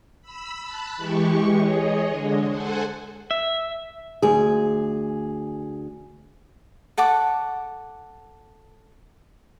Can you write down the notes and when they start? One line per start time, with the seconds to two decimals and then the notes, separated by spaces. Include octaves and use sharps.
0.22 B5 E6
0.63 A5 B5 F#6
0.97 E3 G#3 G4 C#6
1.55 G#4 C#5 D#5
2.08 D3 G#3
2.48 A4 C5 F#5 G#5
3.31 E5
4.22 D2 G#4
6.98 A4 F#5 C#6 D6